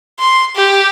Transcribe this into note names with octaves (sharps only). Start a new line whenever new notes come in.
C6
G4